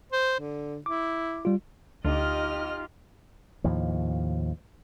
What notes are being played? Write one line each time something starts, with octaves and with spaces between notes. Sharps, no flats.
C5
D3
E4 D6
G3 F4
D2 D#4 F4 G4 D#5 F6
D#2 A2 F3